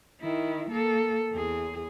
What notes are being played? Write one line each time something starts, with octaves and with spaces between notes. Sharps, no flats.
D#3 E4
A#3 A4
E2 G#4